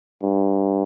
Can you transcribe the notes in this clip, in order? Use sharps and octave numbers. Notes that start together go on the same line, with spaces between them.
G2